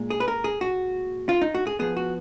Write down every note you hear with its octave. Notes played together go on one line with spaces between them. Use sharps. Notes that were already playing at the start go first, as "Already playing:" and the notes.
Already playing: A#2 G#3
G#4
B4
A#4
G#4
F#4
F4
D#4
F#4
G#4
F3 B3 G#4
F#4